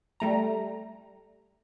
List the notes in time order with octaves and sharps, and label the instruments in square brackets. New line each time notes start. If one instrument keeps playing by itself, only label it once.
[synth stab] G3 A3 A#5